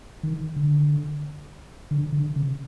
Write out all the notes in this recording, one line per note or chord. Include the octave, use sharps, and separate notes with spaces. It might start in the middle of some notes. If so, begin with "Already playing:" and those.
D#3
D3
D3
D3
C#3